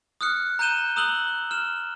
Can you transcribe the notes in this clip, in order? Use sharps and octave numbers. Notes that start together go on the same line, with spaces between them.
D#6 F6 F#6 C#7
A#5 F#6 G6 D#7 E7 G7
A#5 D#6 E6 F#6 F#7 G7
F6 E7